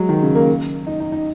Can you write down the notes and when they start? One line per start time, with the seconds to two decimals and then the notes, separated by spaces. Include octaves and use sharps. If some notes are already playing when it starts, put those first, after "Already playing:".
Already playing: F#3 G#3
0.09 D#3
0.23 C#3
0.35 A#3
0.87 D#4
1.00 D#4
1.12 D#4